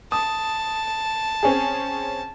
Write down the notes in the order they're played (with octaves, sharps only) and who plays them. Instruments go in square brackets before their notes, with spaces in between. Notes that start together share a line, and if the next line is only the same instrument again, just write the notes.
[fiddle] A5 [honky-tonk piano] D#6
[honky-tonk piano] C4 C#4 G#4